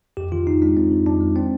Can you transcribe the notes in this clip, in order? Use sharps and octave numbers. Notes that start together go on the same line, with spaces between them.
F2 G4
D#3 F4
F2 D#4
G#3 D4
F2 C4
D#3
F2 D4
G#3
C4